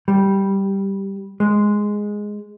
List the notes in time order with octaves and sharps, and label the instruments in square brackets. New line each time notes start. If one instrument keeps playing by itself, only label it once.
[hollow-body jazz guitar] G3
G#3